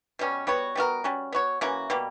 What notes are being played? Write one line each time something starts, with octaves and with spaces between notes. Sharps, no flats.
B2 G3 C#4
G3 B3 F#4 C#5
G3 B3 F#4 A#4
G3 C#4 F#4
B3 F#4 C#5
E3 A#3 C#4 F#4
B2 G3 A#3